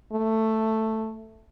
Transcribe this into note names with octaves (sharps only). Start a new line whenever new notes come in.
A3